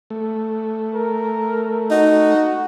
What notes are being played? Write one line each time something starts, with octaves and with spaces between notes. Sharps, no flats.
A3
A#4
D#4 F#4